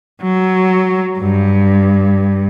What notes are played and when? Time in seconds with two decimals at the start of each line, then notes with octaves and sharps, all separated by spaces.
0.22 F#3
1.19 G2